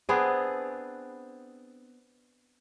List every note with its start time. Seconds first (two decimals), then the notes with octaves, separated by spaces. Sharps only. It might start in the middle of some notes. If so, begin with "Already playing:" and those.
0.09 B3 C4 D4 G#4